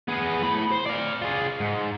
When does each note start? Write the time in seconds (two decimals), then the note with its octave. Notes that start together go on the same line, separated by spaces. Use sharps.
0.08 B3 G#4
0.42 A2 B5
0.71 C5
0.86 D5 F5
1.22 F4 G#4
1.60 G#2